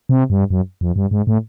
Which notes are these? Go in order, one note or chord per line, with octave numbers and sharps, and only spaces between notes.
C3
G2
F#2
F2
G2
G#2
A2